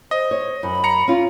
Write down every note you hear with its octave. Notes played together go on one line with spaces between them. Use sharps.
C5 D#5
C#5
F#2 B5
A#5 C#7
C#4 F4